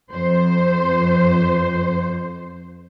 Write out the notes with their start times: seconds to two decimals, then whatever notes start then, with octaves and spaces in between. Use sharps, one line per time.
0.12 F2 C5